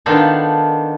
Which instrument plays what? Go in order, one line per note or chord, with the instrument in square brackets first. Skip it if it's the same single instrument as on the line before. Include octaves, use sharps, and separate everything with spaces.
[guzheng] D#3 B3 D4 F4 A4 C5